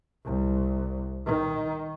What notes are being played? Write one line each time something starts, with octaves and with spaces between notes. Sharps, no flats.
C2
D#3